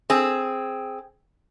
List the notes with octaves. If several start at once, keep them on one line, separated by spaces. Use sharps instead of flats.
C4 G#4